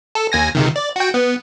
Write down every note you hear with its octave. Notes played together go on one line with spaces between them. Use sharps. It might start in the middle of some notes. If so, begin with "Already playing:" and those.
A4
D#2 G#5 A#6
C#2 C3 D#3
D5
F#4 G5
B3